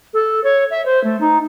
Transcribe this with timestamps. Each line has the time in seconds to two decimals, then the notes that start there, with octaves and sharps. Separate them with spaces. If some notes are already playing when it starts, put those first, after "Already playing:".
0.13 A4
0.44 C#5
0.70 E5
0.85 C5
1.04 A3
1.20 D#4